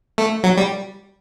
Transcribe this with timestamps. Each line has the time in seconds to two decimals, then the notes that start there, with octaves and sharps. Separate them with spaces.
0.18 A3
0.44 F#3
0.57 G3